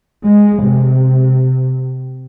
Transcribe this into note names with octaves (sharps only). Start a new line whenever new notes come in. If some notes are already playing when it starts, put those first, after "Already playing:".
G#3
C3